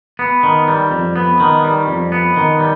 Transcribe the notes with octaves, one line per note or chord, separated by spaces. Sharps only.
B3
D#3
G3
F2
B3
D#3
G3
F2
B3
D#3
G3